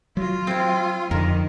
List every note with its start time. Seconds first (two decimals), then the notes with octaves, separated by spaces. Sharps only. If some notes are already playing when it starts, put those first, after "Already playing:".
0.17 F#3 F4
0.47 C4 E4
1.11 F2 D3 D#3 A#4